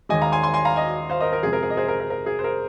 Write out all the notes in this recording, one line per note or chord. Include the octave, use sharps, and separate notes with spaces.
D#2 D#3 G#3 D#5 G#5
F5 A#5
G#5 C6
G#5 C6
G#5 C6
F5 A#5
D#5 G#5
C5 F5
A#4 D#5
A#4
F2 C3 G#3 G#4
A#4
G#4
D#5
G#4 C5
A#4
A#4
A#4
G#4
C5
A#4